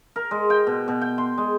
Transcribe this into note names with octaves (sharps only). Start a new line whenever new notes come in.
A#4
G#3
G5
B2
B2
G5
C6
G#3